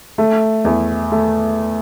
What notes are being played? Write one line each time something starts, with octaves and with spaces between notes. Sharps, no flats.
A3
E2
A3